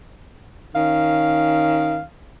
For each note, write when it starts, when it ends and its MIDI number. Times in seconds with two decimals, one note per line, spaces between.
0.75 2.01 51
0.75 2.01 61
0.75 2.01 77